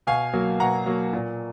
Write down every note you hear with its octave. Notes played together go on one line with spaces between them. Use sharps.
B2 F5 G#5
F#3 A#3
B2 F#5 A#5
F#3 A#3
A#2